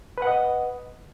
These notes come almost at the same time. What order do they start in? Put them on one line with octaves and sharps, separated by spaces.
B4 F#5 D#5